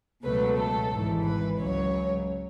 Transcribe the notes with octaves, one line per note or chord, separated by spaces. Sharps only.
C#2 B2 F#3 A3 B4
A4
G#1 G#2 E3
B4
C#2 C#3 F#3 C#5